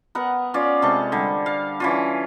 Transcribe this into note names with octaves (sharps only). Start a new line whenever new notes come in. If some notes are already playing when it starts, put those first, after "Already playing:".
B3 A#4 F#5
C#4 F4 D5
C3 G#3 A4 C#6
D3 G3
F5
E3 C#4 F4